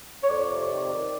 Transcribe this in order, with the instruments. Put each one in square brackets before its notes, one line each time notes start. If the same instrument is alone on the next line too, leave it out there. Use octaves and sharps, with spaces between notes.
[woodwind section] C#5
F2 D5
C3
D#3
D#3